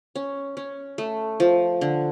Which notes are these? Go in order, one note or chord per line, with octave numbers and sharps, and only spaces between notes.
C#4
C#4
A3
F3
D3